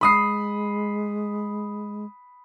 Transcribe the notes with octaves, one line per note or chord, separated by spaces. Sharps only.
G#3 B5 D#6 C7